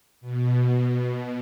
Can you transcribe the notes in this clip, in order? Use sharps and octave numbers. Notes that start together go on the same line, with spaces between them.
B2